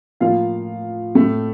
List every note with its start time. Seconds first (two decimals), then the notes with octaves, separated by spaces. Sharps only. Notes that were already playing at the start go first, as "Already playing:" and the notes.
0.20 A2 F3 A#3 F4 F5
1.15 A2 A3